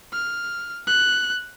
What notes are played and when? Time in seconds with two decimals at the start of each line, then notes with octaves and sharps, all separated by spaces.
0.12 F6
0.87 F#6